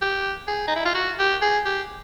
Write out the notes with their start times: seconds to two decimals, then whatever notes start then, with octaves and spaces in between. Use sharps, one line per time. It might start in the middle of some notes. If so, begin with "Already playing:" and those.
0.02 G4
0.48 G#4
0.67 D#4
0.76 E4
0.85 F4
0.95 F#4
1.19 G4
1.42 G#4
1.66 G4